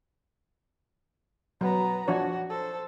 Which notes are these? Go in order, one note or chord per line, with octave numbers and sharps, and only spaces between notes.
F#3 B3 A#5
F3 D4 F#4 C#5
A4 C5